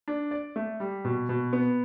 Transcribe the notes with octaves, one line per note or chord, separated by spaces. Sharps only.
D4
D5
A3
G3
B2
B2
B3